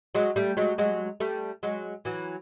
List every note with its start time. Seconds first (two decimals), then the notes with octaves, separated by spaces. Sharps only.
0.15 F#3 G#3
0.36 G3 A3
0.57 F#3 G#3
0.78 F#3 G#3
1.20 G3 A3
1.63 F#3 G#3
2.05 E3 F#3